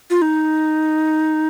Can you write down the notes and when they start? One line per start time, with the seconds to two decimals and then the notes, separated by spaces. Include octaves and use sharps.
0.10 F4
0.22 D#4